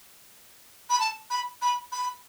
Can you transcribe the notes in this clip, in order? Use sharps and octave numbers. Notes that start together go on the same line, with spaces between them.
B5
A5
B5
B5
B5